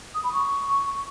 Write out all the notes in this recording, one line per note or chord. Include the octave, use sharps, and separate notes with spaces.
D#6
B5
C#6